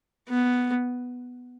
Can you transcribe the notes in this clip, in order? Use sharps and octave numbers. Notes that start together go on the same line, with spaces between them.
B3